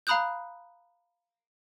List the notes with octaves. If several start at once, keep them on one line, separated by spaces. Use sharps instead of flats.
F5 A#5 B5 D#6 F#6 G6